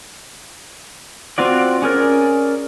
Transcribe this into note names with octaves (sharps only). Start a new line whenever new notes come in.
C4 F4 F#4 D5
C#4 G#4 A#4 D5